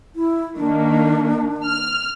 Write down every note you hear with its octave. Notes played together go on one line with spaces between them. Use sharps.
E4
D#3 A#3 D4
F6